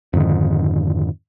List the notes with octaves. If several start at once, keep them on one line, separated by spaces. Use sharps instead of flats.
F2 G#2 D3 D#3